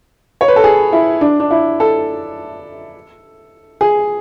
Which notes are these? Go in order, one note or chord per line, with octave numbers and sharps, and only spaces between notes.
C#5
B4
A4
G#4
E4
D4
D4
E4
A4
G#4